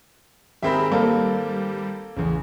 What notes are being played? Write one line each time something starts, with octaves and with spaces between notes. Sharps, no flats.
G#1 C4 G4 G#4 A#4 E5 B5
G3 A#3 A4
A1 E2 C#3